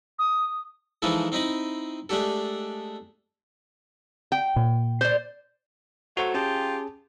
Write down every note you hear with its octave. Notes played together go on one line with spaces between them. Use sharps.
D#6
E3 F3 G#3 D#4 E4 A4
C4 D#4 E4 D#5 B5
G#3 A3 D4 G4 A4
G5
A#2
C5 D5
F#3 A3 F#4 C5 F#5
C#4 F4 G4 G#4 A5